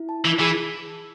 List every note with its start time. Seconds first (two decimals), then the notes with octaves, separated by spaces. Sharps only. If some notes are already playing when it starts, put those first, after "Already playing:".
Already playing: E4
0.09 A5
0.25 E3
0.39 E3 G#4